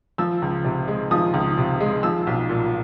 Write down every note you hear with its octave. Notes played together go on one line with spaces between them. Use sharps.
F3 E6
C#2
C3
G#3
F3 D#6
C#2
C3
G#3
F3 E6
B1
A#2